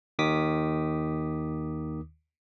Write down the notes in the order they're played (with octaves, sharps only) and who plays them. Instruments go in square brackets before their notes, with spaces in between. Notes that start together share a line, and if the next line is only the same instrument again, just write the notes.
[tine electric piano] D#2 D#3 D6 D#6 B6